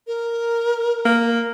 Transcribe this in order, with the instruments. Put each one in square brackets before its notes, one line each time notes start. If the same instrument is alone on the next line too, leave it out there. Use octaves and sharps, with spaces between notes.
[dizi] A#4
[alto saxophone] A#3